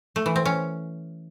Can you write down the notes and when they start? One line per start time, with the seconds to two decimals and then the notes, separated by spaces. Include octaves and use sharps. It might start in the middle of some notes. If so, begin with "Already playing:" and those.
0.16 A3
0.26 E3
0.36 C4
0.45 C#4